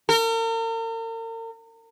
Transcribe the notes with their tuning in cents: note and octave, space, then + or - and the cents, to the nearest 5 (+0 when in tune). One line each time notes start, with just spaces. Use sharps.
A#4 -40